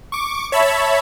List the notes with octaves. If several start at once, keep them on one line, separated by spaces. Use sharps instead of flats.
C#6 D6
C#5 E5 A5 B5